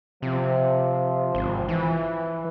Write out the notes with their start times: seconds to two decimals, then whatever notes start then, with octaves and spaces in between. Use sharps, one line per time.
0.22 C3 F3
1.35 G#1
1.68 E3